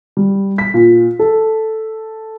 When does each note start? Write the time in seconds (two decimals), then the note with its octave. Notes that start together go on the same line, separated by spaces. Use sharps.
0.17 G3
0.58 B6
0.74 A#2
1.19 A4